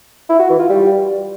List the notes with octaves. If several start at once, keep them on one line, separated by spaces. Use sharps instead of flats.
E4
F#4
E3
F4
G3